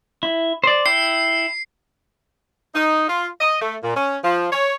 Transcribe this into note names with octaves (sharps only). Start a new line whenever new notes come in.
E4
C5 D5
E4 G5 C7
D#4
F4
D#5
A3
A#2
C#4
F3
C#5